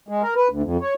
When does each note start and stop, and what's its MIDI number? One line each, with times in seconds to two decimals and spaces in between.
0.08 0.22 56
0.22 0.34 70
0.36 0.48 71
0.49 0.62 38
0.63 0.77 41
0.82 0.94 73